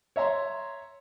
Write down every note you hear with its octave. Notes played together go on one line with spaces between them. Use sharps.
C#5 E5 A#5 C6